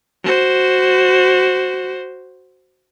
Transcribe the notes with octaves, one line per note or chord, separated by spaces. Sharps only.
F#4 C5